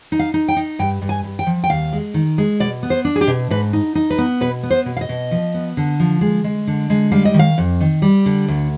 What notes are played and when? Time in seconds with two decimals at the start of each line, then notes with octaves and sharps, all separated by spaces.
0.12 D#4
0.19 F5
0.34 D#4
0.48 G5
0.56 D#4
0.79 G2 G5
1.02 G2
1.09 G#5
1.24 G2
1.39 G5
1.47 F3
1.64 G5
1.70 D#2 F5
1.93 G#3
2.14 D#3
2.38 G#3
2.60 B2 D5
2.83 B3
2.90 C5
3.05 D4
3.16 G#4
3.21 G4
3.27 B2
3.50 G#2 B4
3.73 D#4
3.95 D#4
4.10 B4
4.18 B3
4.41 B2 B4
4.63 B3
4.70 C5
4.86 B2
4.97 F5
5.01 D#5
5.09 B2
5.31 F3
5.54 B3
5.77 D3
6.00 F3
6.21 G#3
6.44 G#3
6.67 D3
6.90 G#3
7.12 G3 F5
7.25 D#5
7.34 D#3
7.39 F5
7.58 F2
7.81 D#3
8.02 G3
8.26 D3
8.48 D2